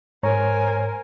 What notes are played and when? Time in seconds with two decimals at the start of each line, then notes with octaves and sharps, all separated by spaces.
0.23 G#2 A#4 C5 C#5 G#5 A#5